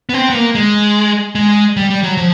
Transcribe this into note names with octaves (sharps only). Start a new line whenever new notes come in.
B3
C4
B3
A#3
G#3
G#3
G3
G3
F#3
F3